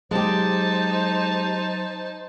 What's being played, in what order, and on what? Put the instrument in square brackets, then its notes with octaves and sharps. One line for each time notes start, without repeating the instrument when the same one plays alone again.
[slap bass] F#3 [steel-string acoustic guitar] G#3 G4 [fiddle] D#4 A5 [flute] C5